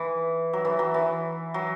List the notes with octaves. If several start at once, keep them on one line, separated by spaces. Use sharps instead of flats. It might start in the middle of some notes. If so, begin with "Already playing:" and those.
Already playing: E3
F#3
E3
F#3
E3
F#3